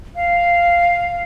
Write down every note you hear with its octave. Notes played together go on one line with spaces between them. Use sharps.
F5